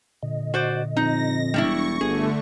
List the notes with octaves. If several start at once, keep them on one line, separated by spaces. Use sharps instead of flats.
A#2 D3 D#5
F#4 C5 D5
F2 D#4 A#6
E1 G3 D4 E4 C#6
G1 D3 A3 G#4